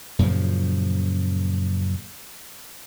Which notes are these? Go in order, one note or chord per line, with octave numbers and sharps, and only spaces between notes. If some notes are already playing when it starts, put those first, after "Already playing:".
F#2 A#2 C#3 F3